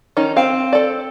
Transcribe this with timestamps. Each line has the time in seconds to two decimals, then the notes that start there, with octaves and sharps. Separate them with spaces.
0.17 D#3 C#4 D#4
0.37 C4 F5
0.73 A4 D5